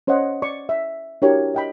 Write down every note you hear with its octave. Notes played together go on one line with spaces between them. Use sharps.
C#4 C5 C#5 D#5 F#5
D5 C#6
E5
D4 E4 F#4 G4 A#4 C#5
D#5 G5 B5